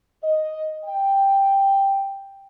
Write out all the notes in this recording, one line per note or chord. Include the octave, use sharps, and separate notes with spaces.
D#5
G5